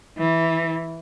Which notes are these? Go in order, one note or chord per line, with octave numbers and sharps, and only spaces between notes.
E3